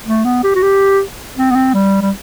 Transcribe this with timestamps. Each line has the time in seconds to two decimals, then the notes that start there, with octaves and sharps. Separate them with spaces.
0.06 A3
0.25 B3
0.44 G4
0.55 F#4
0.62 G4
1.37 C4
1.51 B3
1.55 C4
1.74 G3
2.02 G3